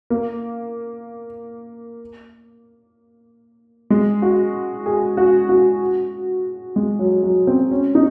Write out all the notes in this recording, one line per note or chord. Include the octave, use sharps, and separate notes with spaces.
A#3
G#3
F#4
G#4
F#4
F#4
G#3
F#3
F#3
C4
C#4
D#4